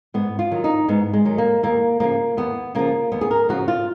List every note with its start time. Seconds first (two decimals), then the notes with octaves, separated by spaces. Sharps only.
0.14 G#2 B3
0.39 F4
0.51 D#3 F#3
0.64 D#4
0.88 G#2 B3
1.13 G#3
1.25 D#3 F#3
1.38 A#3
1.63 D#2 A#3
2.00 C#3 F3 A#3
2.37 D#2 B3
2.75 C#3 F3 A#3
3.12 D#2 B3
3.21 G#4
3.31 A#4
3.49 C#3 F3 F#4
3.68 F4